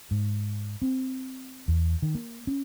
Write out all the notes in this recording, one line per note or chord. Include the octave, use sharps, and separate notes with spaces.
G#2
C4
E2
D#3
A#3
C#4